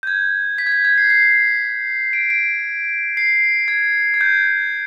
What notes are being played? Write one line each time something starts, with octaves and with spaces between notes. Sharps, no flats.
G6
G#6
B6
G#6
B6
G#6
C7
C7
D7
D7
C7
G#6
G#6
G6